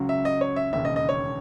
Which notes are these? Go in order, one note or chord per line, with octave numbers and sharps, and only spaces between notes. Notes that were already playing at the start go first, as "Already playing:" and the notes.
Already playing: C#2 C#3 F#3
E5
D#5
C#5
E5
E1 D#2 C#3 E5
D#5
D#5
C#5